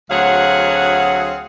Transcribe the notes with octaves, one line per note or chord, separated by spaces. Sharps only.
D2 F#3 C4 G#4 F5 F#5